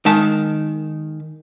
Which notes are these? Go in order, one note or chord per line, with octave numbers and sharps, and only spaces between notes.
D#3 G#3 A5